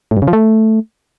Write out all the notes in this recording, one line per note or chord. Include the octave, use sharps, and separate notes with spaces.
A2
G2
C#3
F3
A3